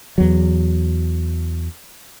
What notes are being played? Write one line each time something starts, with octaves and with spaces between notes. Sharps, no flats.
E2 F#3